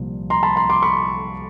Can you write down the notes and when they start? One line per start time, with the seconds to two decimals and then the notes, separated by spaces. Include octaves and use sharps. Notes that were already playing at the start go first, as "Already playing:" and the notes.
Already playing: C2 A#2 F3
0.30 A#5 C6
0.43 A5 B5
0.56 A#5 C6
0.69 C6 D6
0.82 B5 C#6